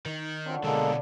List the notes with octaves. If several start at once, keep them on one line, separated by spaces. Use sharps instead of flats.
D#3
D3 F#3 C4 F4
B2 D3 G#3 A#3 D4 A4
B4